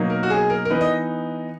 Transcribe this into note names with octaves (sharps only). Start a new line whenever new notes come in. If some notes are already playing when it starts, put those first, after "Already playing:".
Already playing: B2 F#3 A#3 D#4
A#4
F#4
G#4
A#4
A#4
E3 B3 D#4 B4
D#5